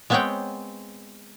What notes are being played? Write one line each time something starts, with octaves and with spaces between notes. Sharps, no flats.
G#3 B3 C4 C#5 F#5 G5